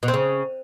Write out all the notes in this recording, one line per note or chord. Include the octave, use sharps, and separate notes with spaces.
B2
C4
C#3